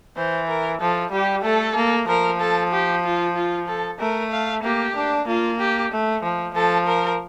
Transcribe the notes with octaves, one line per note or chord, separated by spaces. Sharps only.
E3 C5
A#4
F3 A4
G3 G4
A3 A4
A#3
F3 A#4
A4
G4
F4
F4
A4
A3 A#4
F5
A#3 G4
D4
A#3 F4
G4
A3
F3
F3 A4
A#4